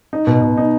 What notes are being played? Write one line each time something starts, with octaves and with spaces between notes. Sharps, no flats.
D#4
B2
B2
D#4